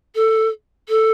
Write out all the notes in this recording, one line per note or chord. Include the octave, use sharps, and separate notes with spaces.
A4
A4